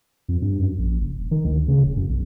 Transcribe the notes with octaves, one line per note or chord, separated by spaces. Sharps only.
F2
G2
F#2
A#1
F#1
D#1
D#3
D2
C#3
F1
F#2
B1